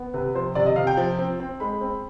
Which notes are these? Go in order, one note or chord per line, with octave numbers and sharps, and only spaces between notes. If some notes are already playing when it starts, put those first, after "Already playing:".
Already playing: B3
C3 B4
F3 C5
C3 D5
D#5
C3 F5
G5
F3
C4
C4
G#3 B5
C4